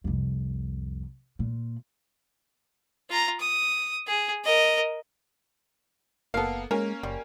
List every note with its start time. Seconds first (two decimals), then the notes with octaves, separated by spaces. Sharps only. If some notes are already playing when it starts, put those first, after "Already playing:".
0.04 C2 F2
1.39 A#2
3.10 F4 A#5
3.40 D#6
4.07 G#4
4.44 A#4 D#5
6.34 F#1 A#3 B3 A4 F5
6.71 G#3 A#3 C#4 A#4
7.03 F#1 G3